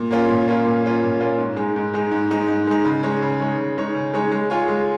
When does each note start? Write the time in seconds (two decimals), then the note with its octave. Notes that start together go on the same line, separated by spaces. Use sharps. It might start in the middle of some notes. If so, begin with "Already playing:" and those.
Already playing: A#2
0.11 A#3 C#4 F4
0.28 A#2
0.48 A#3 C#4 F4
0.65 A#2
0.84 A#3 C#4 F4
1.03 A#2
1.21 A#3 C#4 F4
1.38 G#2
1.56 G#3 D#4
1.76 G#2
1.94 G#3 D#4
2.11 G#2
2.30 G#3 D#4
2.48 G#2
2.67 G#3 D#4
2.85 C#3
3.03 G#3 D#4 C#5
3.22 C#3
3.40 G#3 D#4 C#5
3.58 C#3
3.78 G#3 D#4 C#5
3.95 C#3
4.14 G#3 D#4 C#5
4.32 G#3
4.50 F4 G#4 C#5
4.68 G#3